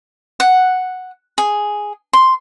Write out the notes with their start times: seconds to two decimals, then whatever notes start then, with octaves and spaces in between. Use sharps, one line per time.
0.40 F#5
1.38 G#4
2.13 C6